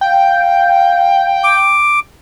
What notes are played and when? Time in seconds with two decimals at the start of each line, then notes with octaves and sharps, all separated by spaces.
0.01 F5 G5
1.44 D6